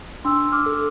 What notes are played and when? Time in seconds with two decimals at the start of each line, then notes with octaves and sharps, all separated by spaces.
0.25 D4 C6 E6
0.52 D6 F6
0.66 A4